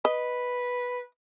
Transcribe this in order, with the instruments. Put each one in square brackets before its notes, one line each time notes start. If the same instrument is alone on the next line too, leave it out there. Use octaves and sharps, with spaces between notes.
[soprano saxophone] B4 [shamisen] D#5